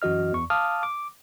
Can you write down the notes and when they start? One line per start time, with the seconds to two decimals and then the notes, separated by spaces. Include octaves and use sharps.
0.02 F#2 E3 F#4 D#5 F6
0.32 E2 C#6
0.50 F5 A5 D6 D#6 F6
0.83 D6